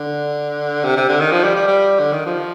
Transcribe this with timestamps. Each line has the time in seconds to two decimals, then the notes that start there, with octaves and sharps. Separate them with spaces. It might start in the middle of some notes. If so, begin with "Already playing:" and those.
Already playing: D3
0.84 C3
0.97 C3
1.09 D3
1.20 D#3
1.32 F3
1.43 G3
1.56 G3
1.67 G3
2.00 D3
2.13 D#3
2.26 F3